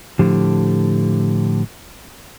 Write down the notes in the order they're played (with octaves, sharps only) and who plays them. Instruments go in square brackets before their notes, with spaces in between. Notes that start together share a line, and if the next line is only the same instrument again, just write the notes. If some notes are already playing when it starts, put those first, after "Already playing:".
[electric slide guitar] A2 D3 F3 G4